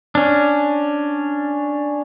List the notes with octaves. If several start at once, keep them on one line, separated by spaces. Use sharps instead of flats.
C#4 D4